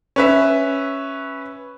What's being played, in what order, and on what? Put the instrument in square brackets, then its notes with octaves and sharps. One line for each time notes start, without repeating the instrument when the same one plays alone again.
[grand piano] C#4 B4 E5